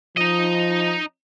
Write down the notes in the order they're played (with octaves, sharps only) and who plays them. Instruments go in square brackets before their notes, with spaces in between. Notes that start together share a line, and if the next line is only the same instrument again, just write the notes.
[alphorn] F3 [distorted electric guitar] D#4 D#5